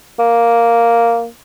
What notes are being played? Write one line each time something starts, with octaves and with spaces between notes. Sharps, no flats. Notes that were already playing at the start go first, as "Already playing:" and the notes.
A#3